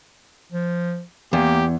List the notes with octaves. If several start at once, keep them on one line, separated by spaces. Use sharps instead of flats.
F3
E2 A#3 G4